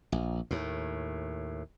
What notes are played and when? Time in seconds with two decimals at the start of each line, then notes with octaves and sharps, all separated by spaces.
0.12 A#1
0.51 D#2 A2